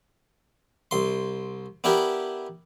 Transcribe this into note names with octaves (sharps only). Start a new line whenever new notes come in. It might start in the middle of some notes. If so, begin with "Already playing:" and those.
C2 C6
B3 D4 E4 G4 A#4